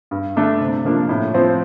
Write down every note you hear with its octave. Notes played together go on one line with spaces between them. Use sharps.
G2
D3 A3 D4 A4
C3
F3 A#3 D4
A2
F3 C4